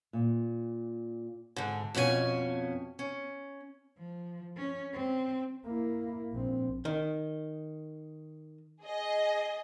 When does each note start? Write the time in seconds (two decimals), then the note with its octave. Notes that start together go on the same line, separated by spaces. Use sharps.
0.13 A#2
1.56 G#2 D3
1.95 F2 B2 C#4 F4 G#5
2.99 C#4
3.98 F3
4.56 C#4
4.93 C4
5.66 A#3 E4
6.32 A#1 C4
6.85 D#3
8.82 G#4 D#5